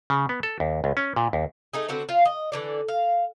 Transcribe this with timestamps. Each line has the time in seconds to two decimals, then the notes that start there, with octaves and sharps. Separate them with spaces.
0.10 C#3
0.29 B3
0.43 A4
0.60 D#2
0.84 C#2
0.97 C#4
1.16 A#2
1.33 D#2
1.73 A3 D#4 G#4
1.88 D3 C4 F#4 B4
2.09 F4 F5
2.25 D#5
2.52 D3 E3 D5
2.88 F5